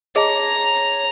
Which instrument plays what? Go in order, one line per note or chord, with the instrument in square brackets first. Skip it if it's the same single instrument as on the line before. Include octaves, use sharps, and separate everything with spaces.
[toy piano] G#4 D#5 A5 [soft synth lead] C#5 [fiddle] A#5